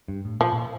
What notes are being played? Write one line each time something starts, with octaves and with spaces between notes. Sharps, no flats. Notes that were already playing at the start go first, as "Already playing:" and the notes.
G2
A2
A#2 F3
A#2